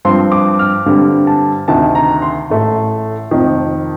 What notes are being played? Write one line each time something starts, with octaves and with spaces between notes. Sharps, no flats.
G2 F3 C4 C6
D6
F6
G2 D3 G3 C4
A5
D2 C3 D#3 A5
A#5
C6
A1 A2 A3
F1 F2 D#3